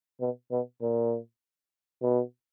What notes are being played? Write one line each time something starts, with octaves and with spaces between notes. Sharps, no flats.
B2
B2
A#2
B2